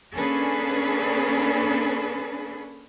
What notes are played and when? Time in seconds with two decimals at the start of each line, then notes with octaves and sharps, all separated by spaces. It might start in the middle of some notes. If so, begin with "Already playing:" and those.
0.15 A#3 C#4 D4 G#4 A4 B4